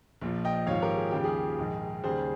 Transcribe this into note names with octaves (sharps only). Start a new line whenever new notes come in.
A#1 A#2 F3
D#5 G5
G#1 G#2 F3 C#5 F5
G4 A#4
G#4
D#2 C#3 F3 G4
G#4
A#1 G#2 D#3
D#2 C#3 G3 G#4 C5